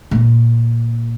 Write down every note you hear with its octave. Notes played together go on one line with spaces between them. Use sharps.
A#2